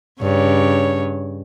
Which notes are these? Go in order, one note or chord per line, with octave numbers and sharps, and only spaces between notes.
G2 C#3 C#5